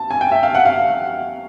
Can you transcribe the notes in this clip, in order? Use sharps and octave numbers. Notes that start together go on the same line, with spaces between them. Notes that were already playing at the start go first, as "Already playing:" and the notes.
Already playing: A5
G#5
G5
E5
F5
F#5
F5